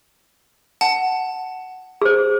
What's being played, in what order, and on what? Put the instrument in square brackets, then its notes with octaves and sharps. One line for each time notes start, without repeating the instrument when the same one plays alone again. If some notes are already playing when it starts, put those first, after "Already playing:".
[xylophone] F#5 A5
[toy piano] G#4 C5